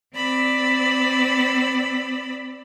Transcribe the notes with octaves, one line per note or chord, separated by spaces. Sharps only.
C4 D5 B5 E6